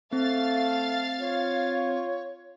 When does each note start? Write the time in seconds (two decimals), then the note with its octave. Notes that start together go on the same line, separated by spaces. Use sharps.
0.13 A3 C4 F5 A6
1.20 F4 C#5